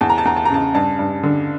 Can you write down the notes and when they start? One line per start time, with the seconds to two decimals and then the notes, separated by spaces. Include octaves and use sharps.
0.01 E2 A5
0.09 A#5
0.18 A5
0.25 E2 A#5
0.36 A5
0.45 A#5
0.51 C#3 A5
0.74 G2 A5
0.99 G2
1.23 D3